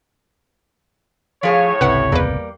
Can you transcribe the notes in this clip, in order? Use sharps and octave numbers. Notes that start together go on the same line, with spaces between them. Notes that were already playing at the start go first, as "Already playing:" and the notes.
A2 F3 G#4 C#5 F5
G#1 C#2 C3 A3 E4 B4 F#5
E2 G3 A#3 B4